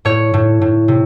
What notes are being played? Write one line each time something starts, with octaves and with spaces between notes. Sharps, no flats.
A2 C#5
A2
A2
C3